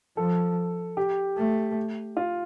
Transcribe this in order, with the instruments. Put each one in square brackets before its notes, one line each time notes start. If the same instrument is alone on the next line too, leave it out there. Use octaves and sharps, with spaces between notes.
[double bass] F3 [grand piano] A4
[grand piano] G4
[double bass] A3
[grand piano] F4